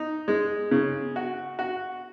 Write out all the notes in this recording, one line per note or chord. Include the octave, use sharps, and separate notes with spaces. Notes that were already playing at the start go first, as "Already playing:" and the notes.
Already playing: D#4
G#3
C#3
F#4
F#4